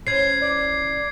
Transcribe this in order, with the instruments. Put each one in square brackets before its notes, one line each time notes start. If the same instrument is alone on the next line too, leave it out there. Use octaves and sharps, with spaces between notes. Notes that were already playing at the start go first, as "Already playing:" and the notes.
[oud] C4 C#4 E4 [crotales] G#6 C7
[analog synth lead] D5